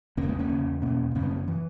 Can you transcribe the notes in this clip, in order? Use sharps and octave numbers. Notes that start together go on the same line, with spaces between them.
E2 C#3 A#3 C#4
G#3 B3
A#3 C#4
E2 C#3
E2 B2 A#3 C#4
F#2 C#3 A#3 C#4
G#3 B3
A#3 C#4
E3